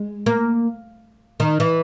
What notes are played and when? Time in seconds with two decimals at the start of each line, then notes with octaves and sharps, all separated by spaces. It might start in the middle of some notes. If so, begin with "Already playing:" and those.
Already playing: G#3
0.26 A#3
1.40 D#3
1.60 E3